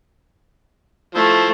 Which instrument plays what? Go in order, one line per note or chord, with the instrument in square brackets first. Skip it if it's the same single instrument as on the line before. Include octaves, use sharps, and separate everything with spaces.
[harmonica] F3 E4 C5 [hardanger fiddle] A3